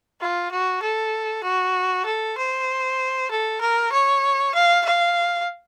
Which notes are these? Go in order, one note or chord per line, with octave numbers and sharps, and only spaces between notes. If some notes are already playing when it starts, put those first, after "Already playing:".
F4
F#4
A4
F#4
A4
C5
A4
A#4
C#5
F5
F5